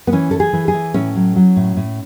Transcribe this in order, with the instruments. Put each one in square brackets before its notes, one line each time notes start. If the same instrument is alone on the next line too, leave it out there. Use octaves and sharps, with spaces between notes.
[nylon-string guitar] B3
E3 C#4
E3 A4
G#4
E3
G#4
E3
A2 C#4
F#3
F#3
A2
A2